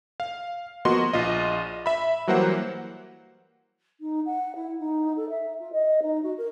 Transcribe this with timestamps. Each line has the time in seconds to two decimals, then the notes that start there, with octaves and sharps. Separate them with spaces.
0.20 F5
0.85 F3 A#3 B3 F#4 D#5 C6
1.13 A#1 F4 D#5
1.86 E5 B5
2.27 E3 F#3 G3 A#3 C5 F#5
4.00 D#4
4.26 F#5
4.55 E4
4.79 D#4
5.16 A4
5.29 E5
5.60 F4
5.72 D#5
6.02 D#4
6.23 F#4
6.38 A#4